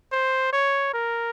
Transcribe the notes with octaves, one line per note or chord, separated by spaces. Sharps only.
C5
C#5
A#4